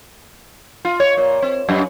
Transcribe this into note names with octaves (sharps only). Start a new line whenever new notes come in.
F4
C#5
A#2
C4
F#2